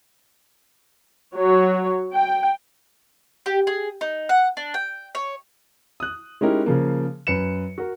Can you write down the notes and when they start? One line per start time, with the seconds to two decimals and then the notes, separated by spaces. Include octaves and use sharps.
1.35 F#3 C#5
2.12 G5
3.46 G4
3.67 G#4
4.01 D#4
4.29 F#5
4.57 D4
4.74 G5
5.15 C#5
6.00 D#6 F#6
6.41 G#3 C#4 D#4 E4 G4 A#4
6.66 C#3 F3 A#3
7.27 F#2 B4 C#7 E7
7.78 F#4 A#4